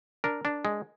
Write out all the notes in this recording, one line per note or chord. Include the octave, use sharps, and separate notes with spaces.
D4 A#4
D4
G#3